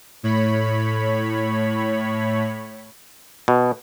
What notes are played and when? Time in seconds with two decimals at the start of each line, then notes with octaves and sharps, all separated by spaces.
0.23 A2 C#5 B5
3.48 B2